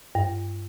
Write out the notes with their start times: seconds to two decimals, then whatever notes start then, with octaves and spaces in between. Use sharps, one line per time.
0.15 G2